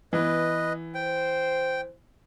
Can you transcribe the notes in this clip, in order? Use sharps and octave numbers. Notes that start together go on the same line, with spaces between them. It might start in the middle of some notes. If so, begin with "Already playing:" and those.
E3 B3 B4 D#5
C5 G5